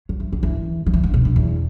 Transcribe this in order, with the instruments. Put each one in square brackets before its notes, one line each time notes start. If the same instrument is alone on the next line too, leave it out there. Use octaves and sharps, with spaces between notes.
[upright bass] F#3
E3
D3
E3
F#3
E3
D3
B2
F#2
E2